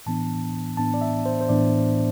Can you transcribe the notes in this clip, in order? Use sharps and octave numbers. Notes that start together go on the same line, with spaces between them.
A2 E3 B3 D4 A5
A2 E3 B3 D4 A5
D5
E5
C5
C5
A2 E3 B3 D4 D5